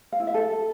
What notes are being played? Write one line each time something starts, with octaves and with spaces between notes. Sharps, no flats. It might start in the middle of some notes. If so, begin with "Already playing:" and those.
F5
E4
E5
A4